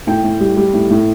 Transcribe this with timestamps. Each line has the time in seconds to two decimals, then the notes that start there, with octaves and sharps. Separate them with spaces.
0.07 A2 G5
0.24 A2
0.40 G3
0.57 G3
0.73 A2
0.90 A2